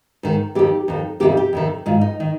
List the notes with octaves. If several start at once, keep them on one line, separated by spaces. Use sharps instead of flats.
G#2 D#3
F2 D#3 G4
F2 D#3
F2 C3 D#3 G4
G4
F2 C3 D#3
G#2 D#3 F4
D#4
D#3